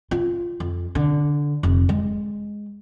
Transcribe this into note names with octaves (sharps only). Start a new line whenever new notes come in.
F4
F2
D3
F1
G#3